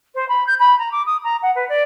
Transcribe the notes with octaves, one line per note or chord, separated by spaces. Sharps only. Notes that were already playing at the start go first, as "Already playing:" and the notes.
C5
B5
G6
B5
A#5
D6
D#6
A#5
F#5
B4
D5